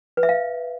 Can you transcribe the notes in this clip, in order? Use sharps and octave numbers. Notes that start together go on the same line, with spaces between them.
B4
E5
F5